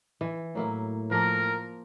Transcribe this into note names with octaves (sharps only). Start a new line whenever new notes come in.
E3
A2 F#3 A#3 E4
F3 A#3 A#4